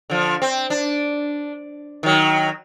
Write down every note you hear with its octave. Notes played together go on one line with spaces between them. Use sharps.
D3 F3
C4
D4
D#3 F#3